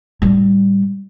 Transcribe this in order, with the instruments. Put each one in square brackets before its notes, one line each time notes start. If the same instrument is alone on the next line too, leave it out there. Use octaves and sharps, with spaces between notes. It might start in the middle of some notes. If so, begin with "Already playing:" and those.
[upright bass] A2 G3